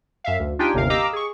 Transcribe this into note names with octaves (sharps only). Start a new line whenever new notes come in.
F#2 E5 F5
D2
D4 D#4 F4 G4 G5 G#5
G1 D#2 C3 A#4 F5
G4 D#5 F5 A#5 D6 E6
G#4 C#6